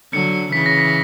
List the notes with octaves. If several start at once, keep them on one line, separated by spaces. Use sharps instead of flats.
D3 F#3 C#7
C#3 E3 B6
A#6
B6